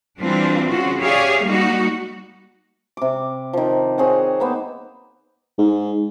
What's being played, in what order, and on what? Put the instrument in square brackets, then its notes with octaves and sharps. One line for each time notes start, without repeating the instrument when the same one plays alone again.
[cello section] E3 G3 C4 D4 F4
C#3 F4 F#4
G4 G#4 C#5 D5 E5 F5
G3 A#3 D#4 F#4
[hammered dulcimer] C3 D6
D#3 F3
C4 G#4 C#5 F#5
A#3 B3 C5
[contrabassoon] G#2